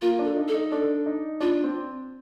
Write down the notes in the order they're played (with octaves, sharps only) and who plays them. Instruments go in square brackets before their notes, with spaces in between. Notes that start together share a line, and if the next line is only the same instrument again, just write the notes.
[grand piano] A#3 [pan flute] F4
[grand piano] D4
[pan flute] A4
[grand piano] D#4
[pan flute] A4
[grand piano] D#4
[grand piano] D4 [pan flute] A4
[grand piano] D#4
[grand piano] D4 [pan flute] F4
[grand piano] C4